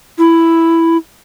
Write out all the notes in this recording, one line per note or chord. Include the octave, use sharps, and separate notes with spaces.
E4